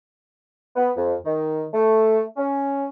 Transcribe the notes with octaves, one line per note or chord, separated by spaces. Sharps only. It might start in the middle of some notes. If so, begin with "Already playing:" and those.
B3
F2
D#3
A3
C#4